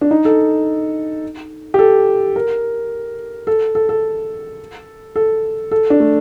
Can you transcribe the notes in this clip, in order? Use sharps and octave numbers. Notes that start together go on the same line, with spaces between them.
D4
D#4
A4
G4
A4
A#4
A4
A4
A4
A4
A4
D4
A3